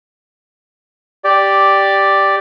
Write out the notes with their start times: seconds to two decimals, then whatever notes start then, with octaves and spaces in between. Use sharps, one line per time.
1.24 G4 D5